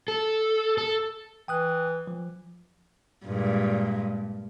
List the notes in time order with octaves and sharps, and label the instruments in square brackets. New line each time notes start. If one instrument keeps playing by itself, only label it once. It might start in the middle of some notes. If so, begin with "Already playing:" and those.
[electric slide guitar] A4
A4
[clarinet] E3 [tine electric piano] G5 D#6 F#6
[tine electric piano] F3
[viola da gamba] G2 A#2 G#3